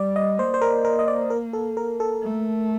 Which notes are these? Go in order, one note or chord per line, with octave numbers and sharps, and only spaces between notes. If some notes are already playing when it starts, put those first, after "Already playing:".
Already playing: G3 D5
D#5
A#3 C5
C5
A#4
A#4
D#5
D5
A#4
A4
A#4
A4
A3